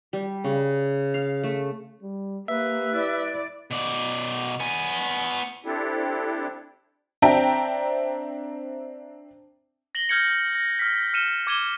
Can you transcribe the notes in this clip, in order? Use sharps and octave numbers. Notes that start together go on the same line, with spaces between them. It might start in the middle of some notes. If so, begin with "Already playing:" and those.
G3
C#3
F5
A3
G3
A#3 G4 B4 E5
E4 D5
B2 D5
B3 G#5
C4 D4 E4 G4 A4
C4 D4 E5 G5 A5 A#5
A#6 F#7 G7
F6 G6 G#6 A#6 C#7 F#7
A#6
F6 B6
F6 C#7 D#7 E7 G7
D6 F6 G#6 D#7 E7 G7